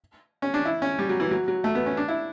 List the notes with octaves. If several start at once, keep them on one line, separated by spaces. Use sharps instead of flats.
C#4
D4
E4
C#4
G3
F#3
E3
F#3
F#3
A3
B3
C#4
D4
E4